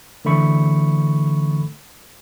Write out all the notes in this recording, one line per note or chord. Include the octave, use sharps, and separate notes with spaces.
D3 E3 A3 B5 C#6